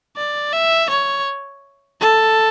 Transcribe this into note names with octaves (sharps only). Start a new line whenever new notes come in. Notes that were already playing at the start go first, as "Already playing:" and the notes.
D5
E5
C#5
A4